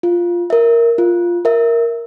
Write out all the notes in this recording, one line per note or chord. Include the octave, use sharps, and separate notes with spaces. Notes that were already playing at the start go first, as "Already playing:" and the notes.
F4
A#4 E5
F4
A#4 E5